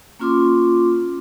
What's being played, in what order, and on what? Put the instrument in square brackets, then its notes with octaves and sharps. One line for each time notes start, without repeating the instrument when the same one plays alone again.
[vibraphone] A#3 C#4 F4 C6 D6